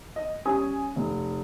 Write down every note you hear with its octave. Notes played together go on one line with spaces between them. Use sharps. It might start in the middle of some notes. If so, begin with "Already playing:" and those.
D#5
G3 C#4 G#5 D#6
F1